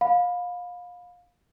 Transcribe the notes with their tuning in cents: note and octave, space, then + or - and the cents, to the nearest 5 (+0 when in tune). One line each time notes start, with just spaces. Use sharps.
F5 +25 B5 +0